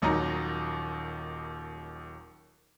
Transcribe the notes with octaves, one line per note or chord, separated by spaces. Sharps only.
D#1 D#2 F#3 D#4 A#5